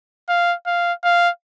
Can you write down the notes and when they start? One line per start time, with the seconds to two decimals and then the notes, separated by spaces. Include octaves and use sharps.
0.29 F5
0.66 F5
1.04 F5